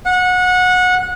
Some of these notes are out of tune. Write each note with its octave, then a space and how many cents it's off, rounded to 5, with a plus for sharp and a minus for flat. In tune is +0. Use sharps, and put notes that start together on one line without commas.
F#5 -25